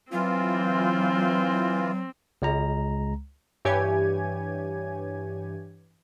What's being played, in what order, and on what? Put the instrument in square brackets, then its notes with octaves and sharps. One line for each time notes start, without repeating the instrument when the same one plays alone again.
[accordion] E3 F4 [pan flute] F#3 [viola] C4
[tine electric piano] C#2 G#3 A#5
[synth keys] G2 E3 G4 C#5 G#5 G#6